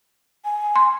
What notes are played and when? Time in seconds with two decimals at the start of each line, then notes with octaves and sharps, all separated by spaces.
0.45 G#5
0.76 C6